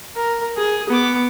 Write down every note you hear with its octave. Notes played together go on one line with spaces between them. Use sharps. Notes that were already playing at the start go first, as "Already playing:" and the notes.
A#4
G#4
B3 D6